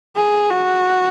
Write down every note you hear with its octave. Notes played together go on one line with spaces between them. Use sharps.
G#4
F#4